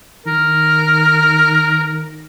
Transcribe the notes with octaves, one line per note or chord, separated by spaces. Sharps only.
D#3 A#4